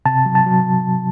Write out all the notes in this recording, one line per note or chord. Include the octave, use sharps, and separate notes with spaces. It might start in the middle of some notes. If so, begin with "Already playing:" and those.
C3 A5
F#3
A5
F#3